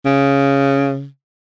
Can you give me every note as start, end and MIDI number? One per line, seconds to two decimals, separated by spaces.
0.05 1.07 49